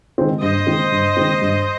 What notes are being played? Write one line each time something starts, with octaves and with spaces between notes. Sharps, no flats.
D#3 G#3 C4
G2 C5 D#5
D#3 G#3 C4
G2
D#3 G#3 C4
G2